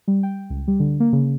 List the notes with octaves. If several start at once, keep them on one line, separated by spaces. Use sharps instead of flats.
G3
G5
C#2
G3
D3
A#3
C#3